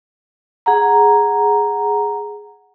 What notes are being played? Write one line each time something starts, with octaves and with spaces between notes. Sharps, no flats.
G#4 F#5 A#5